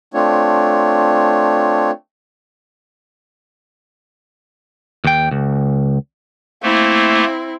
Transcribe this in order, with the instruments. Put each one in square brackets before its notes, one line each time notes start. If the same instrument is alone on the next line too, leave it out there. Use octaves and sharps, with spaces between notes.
[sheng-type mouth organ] A3 C4 D4 F4 C#5
[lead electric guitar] D#2 G5
C#2
[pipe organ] A3 A#3 [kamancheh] C4 E4